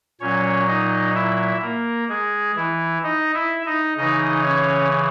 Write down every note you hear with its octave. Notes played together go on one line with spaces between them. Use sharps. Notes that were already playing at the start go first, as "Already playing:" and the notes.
A#2 F#3 C#4 C#5
D#4 D#5
E4 E5
A#3 A#4
G#3 G#4
E3 E4
D#4 D#5
E4 E5
D#4 D#5
C#3 E3 D#4 D#5
C#4 C#5